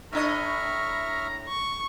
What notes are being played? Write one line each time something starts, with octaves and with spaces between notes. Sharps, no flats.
A2 D4 D#5 E5 A#5 C#6 F6
C#6